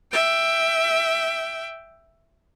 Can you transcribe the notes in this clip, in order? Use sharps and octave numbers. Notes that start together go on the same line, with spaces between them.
E5 G5